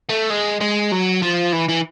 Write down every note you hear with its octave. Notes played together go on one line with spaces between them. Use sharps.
A3
G#3
G#3
F#3
F3
E3
E3